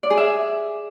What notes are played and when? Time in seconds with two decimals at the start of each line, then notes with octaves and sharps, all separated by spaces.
0.03 D5
0.10 G#4
0.17 E5